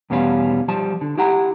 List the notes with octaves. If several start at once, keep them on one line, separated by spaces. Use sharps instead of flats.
E2 B2 G3 C#4 F5
F3 G3 A5
D3
E4 G4 F#5 A#5